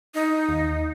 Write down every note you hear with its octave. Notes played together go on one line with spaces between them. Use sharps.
D#4
D#2